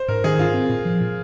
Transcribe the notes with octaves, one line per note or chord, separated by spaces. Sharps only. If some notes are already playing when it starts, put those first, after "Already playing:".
Already playing: C5
G#2 A#4
D#3 G#4
G#2 F4
C4
A#2
F3
A#2